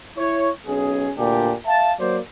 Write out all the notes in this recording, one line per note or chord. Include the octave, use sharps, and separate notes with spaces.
E4 C#5
B1 C#4 G#4
D2 A#2 D4 G4
E5 F5 A5
F#3 A#3 C5 D5